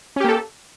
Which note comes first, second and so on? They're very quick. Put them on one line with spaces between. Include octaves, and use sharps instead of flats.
C#4 G4 A#3 A4